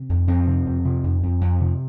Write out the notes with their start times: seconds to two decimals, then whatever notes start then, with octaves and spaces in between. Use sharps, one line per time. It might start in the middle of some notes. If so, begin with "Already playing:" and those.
Already playing: C3
0.09 F2
0.27 F2 C4
0.46 C3
0.66 F2
0.85 C3
1.04 F2
1.23 F2
1.41 F2
1.60 C3